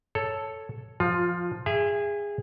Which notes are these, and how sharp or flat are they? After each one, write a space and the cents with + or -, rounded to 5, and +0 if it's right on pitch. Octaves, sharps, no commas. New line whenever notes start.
A4 +0 C#5 +0
F3 +0 F4 +20
G#4 -20 E5 +25 G5 +0